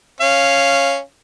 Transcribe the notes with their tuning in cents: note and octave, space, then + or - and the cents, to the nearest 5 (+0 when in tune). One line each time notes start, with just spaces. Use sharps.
C#4 -5 F5 -10